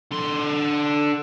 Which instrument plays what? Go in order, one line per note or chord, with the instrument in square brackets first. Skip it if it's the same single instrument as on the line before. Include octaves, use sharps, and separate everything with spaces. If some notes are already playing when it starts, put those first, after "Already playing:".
[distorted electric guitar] D3 C6